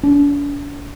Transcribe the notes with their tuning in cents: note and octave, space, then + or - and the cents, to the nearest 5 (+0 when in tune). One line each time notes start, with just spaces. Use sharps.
D4 -45